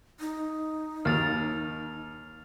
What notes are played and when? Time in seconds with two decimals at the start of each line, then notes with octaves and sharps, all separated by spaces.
0.20 D#4
1.05 D#2 F6 A6 F7